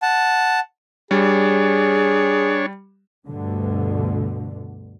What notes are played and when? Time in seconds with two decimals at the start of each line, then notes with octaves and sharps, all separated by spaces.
0.02 F#5 A5
1.11 G3 D4 G#4 C#5
3.28 D2 G2 B2 D3